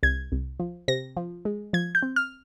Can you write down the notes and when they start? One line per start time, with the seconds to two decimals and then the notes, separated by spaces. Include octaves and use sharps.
0.03 C2 G#6
0.32 C2
0.60 F3
0.88 C3 A#6
1.17 F3
1.45 G#3
1.73 F3 G#6
1.95 G6
2.03 C4
2.16 F6